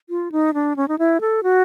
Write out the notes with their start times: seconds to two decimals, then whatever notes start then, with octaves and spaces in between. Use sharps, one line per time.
0.09 F4
0.32 D#4
0.54 D4
0.76 C#4
0.88 D#4
0.99 E4
1.21 A4
1.43 F#4